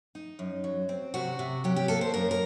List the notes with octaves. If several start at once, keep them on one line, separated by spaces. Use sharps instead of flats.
D#4
F#2
F#3
C4
C3 F#4
C3
F#3 G4
G4
A#3 A4
C5
F#2 A#4
A#4